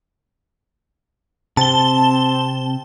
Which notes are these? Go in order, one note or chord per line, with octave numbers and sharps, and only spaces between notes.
C3 C4 A5 G7